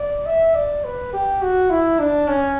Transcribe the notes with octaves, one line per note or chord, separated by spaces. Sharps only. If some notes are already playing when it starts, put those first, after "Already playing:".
Already playing: D5
E5
D5
B4
G4
F#4
E4
D4
C#4